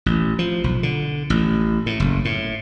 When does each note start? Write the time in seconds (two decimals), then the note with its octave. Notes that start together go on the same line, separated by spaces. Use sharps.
0.06 A1
0.39 F3
0.64 B1
0.83 D3
1.30 A1
1.86 A2
2.00 F#1
2.25 A2